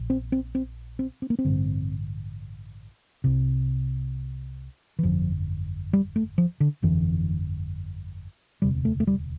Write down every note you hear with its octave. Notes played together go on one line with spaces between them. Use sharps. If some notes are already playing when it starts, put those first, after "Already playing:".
Already playing: A#1 A#2
C4
C4
C4
C4
C4
A#3
C4
A1 G2 D3
C2 C3
E3
G1 F2 D3 F3
G3
A3
F3
D3
G1 F2 D3 E3
E1 D2 C3 G3
A3
A3
G3